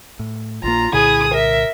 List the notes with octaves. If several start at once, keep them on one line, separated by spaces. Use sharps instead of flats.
A2
A#1 A#2 A#3 F4 A#5
C2 A#2 D3 E4 G#4 D#6
A#4 E5